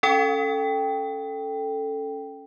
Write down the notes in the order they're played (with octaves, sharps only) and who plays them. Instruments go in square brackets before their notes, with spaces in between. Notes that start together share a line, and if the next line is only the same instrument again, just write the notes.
[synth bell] C#4 A4 G5